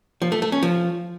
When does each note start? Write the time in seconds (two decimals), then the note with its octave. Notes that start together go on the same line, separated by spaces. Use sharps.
0.22 F3
0.32 A3
0.42 A3
0.52 C#4
0.63 F3